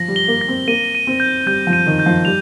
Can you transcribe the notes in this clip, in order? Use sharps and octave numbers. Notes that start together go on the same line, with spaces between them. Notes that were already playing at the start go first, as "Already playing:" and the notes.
Already playing: F3 A#6
G3
G7
A#3
A#6
C4
A#3 D#7
D#7
C4
G6
G3 G6
F3
D#7
D#3
G6
F3
G3 F7